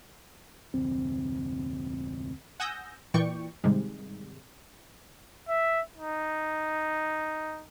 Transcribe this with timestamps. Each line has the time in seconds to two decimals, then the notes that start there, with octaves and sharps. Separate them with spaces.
0.74 F1 D2 C4
2.60 F#5 G#5 D#6 E6 G6 A#6
3.14 A#2 E3 D5 G5 C#6
3.64 G#2 C3 D#3 G3 G#3
5.49 E5
5.97 D#4